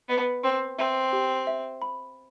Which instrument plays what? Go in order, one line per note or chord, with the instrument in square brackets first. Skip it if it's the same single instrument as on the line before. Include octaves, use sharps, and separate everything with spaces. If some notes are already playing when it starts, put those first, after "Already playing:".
[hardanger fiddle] B3 [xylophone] D#5
[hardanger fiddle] C4 [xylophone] C6
[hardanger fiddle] C4 [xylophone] E5
[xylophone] G4
E5
B5